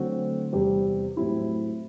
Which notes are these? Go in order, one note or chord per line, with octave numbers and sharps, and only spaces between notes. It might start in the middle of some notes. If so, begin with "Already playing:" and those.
Already playing: D3 F#3 A3 C4 F#4
E2 C3 G3 C4 G4
A2 F#3 C4 E4 G4